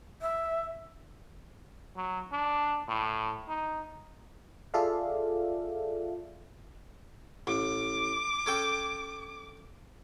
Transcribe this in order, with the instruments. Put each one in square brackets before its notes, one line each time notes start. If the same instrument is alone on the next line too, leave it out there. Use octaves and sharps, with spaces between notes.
[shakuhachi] E5
[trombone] F#3
D4
A2
D#4
[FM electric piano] F4 G#4 A4 D5 E5 F5
[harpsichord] A1 [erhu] D6
[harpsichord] C#4 A4 G5